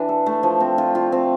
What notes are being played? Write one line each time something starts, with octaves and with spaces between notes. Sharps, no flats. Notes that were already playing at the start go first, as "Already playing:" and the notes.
Already playing: E3 D4
A4
A3
F3
C4
F4
F4
C4